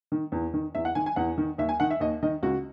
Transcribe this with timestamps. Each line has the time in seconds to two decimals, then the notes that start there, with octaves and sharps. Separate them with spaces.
0.12 D#3
0.32 E2
0.54 D#3
0.75 E2 E5
0.85 F#5
0.95 D#3 G#5
1.06 G#5
1.16 E2 F#5
1.38 D#3
1.58 D#2 E5
1.69 G#5
1.80 D#3 F#5
1.90 E5
2.00 D#2 D#5
2.23 D#3 D#5
2.43 C#2 F#4